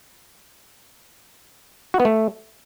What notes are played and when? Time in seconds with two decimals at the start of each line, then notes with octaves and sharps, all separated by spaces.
1.94 F#4
2.00 B3
2.05 A3